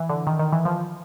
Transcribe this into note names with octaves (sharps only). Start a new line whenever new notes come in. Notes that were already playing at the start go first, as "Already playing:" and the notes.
Already playing: E3
D3
D#3
D#3
E3
F3